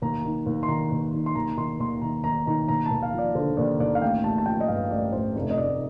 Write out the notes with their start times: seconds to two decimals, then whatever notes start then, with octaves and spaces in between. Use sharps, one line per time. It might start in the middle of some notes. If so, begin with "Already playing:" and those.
0.02 D#2 A#5
0.25 D#3
0.46 D#2
0.63 C6
0.68 D#3 A#5
0.92 D#2
1.13 D#3
1.26 C6
1.35 D#2 A#5
1.57 D#3 C6
1.79 D#2 C6
2.02 D#3 A#5
2.24 D#2 A#5
2.47 D#3 A#5
2.68 D#2 A#5
2.86 D#2 A5
3.03 F5
3.14 F3 D5
3.35 D3 C5
3.57 D#2 D5
3.80 D#2 D5
3.95 F5
4.01 A1 G5
4.24 A1 A5
4.38 A5
4.46 F3 G5
4.61 D#5
4.68 G2 F5
4.90 A1 D5
5.12 A1 C5
5.36 F1
5.51 D#5
5.58 F1 D5